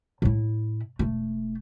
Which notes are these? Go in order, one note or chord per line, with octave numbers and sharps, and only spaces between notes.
A2 E4
E1 A3